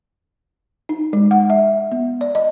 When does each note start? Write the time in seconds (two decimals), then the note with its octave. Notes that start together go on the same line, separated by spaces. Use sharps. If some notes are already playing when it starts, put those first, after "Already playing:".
0.89 D#4
1.13 G#3
1.31 F#5
1.50 E5
1.92 B3
2.21 D5
2.35 D#5